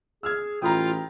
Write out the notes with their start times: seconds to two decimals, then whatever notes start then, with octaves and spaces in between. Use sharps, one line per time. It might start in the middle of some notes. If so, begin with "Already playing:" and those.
0.23 G#4 E6 F6 G#6
0.62 A1 F4 G5 A#5 B5 D#6